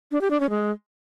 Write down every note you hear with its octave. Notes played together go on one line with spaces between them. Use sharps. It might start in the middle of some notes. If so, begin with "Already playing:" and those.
D4
G4
D4
C#4
G#3